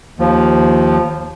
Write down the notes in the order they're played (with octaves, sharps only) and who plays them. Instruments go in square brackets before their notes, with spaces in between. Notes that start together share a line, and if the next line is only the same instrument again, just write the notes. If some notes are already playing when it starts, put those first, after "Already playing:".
[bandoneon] D#2 F3